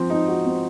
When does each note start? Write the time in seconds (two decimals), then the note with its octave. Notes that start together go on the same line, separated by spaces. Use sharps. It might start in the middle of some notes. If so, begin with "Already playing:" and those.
Already playing: F3 C4
0.10 D#4
0.28 F#4
0.46 C4